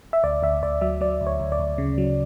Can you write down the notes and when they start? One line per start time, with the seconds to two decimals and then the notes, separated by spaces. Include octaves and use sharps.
0.13 E5
0.24 D2 D5
0.43 D2 E5
0.63 D2 D5
0.81 F#3 E5
1.01 F#3 D5
1.21 D2
1.27 C#5
1.40 D2
1.52 D5
1.60 D2
1.78 C#3
1.98 F#3